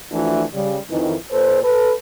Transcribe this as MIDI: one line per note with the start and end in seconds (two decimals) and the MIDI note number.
0.12 0.44 52
0.12 0.44 53
0.12 0.44 57
0.12 0.44 62
0.12 0.44 65
0.12 0.44 66
0.54 0.76 49
0.54 0.76 55
0.90 1.15 41
0.90 1.15 51
0.90 1.15 52
1.31 1.61 46
1.31 1.61 69
1.31 1.61 71
1.31 1.61 72
1.63 1.93 69
1.63 1.93 71